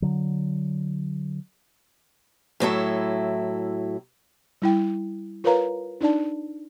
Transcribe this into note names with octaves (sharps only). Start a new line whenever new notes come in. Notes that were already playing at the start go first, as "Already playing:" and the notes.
D3 F#3
A2 F#3 E4 A4
G3 E4 G5
F4 A#4 B4 C#5 F5 A#5
D4 D#4 D5 A5